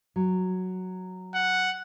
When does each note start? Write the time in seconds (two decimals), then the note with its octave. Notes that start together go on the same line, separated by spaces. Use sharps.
0.16 F#3
1.35 F#5